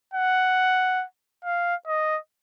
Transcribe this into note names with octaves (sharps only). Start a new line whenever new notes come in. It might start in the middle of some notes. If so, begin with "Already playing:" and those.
F#5
F5
D#5